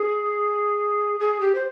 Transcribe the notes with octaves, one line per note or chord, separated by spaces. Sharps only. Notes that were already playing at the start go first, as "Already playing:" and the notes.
Already playing: G#4
G#4
G4
C5